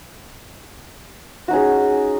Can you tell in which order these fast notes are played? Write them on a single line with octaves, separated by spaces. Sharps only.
F#4 D#4 C#4 G#4